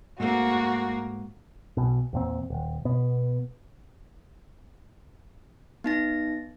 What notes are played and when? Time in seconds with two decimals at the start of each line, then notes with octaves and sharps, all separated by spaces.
0.20 G#2 A3 A#3 C4 F#4
1.77 B1 B2
2.13 E2 A#2 C4
2.50 D#1
2.85 B2 B3
5.84 B3 D#4 A#6